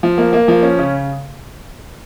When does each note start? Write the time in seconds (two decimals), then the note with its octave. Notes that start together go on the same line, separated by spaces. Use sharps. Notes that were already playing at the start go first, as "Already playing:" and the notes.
0.03 F3
0.18 A#3
0.33 A#3
0.48 F3
0.63 C#4
0.79 C#3